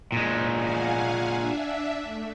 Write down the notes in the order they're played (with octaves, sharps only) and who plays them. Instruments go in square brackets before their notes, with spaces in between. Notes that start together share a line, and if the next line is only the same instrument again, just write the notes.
[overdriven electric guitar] A#2 G#3
[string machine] F5 F#5 G#5
D4 E5
A3